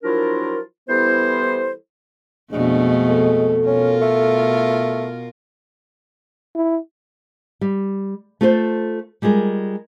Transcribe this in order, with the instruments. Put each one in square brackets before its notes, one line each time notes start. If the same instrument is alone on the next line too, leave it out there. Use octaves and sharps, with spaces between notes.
[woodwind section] F3 F#3 D4 E4 F4 A#4
E3 G3 B3 E4 A4 C5
[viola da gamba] F2 B2 A3 [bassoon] G#3 [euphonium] D4
[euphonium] A4
[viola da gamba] B2 F4 A#4 [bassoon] C#4
[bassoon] A3
[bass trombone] E4
[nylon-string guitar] G3
A3 F4 A4 B4 C5
G3 G#3 F4 G#4 A#4